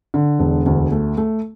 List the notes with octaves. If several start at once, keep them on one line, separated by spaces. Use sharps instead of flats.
D3
E1
D2
A3
A3